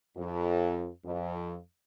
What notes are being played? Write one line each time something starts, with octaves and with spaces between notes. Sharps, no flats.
F2
F2